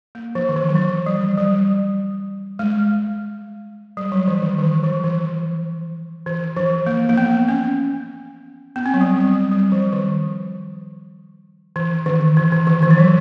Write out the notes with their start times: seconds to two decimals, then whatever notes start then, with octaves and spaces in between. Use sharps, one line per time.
0.15 A#3
0.35 F3
0.49 D#3
0.56 E3
0.69 F#3
0.76 F3
1.06 G3
1.37 G3
2.59 G#3
3.97 G3
4.12 F#3
4.28 E3
4.42 D#3
4.58 D#3
4.63 E3
4.83 F3
5.04 E3
6.26 E3
6.57 F3
6.86 A#3
7.09 A#3
7.18 B3
7.48 C#4
8.76 B3
8.86 C4
8.94 F#3
9.01 G3
9.16 G3
9.32 G3
9.52 G3
9.72 F3
9.93 D#3
11.76 E3
12.06 D#3
12.37 E3
12.52 E3
12.67 D#3
12.82 E3
12.91 F3
12.98 F#3